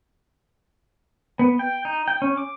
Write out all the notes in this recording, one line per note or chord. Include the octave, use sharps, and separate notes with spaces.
B3
G5
D#4
G5
C#4
D6